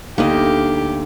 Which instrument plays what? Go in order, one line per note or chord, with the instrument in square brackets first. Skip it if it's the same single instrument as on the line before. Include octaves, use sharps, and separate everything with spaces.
[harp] D2 B3 F5 [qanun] A#3 D#4 D#5 [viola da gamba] G4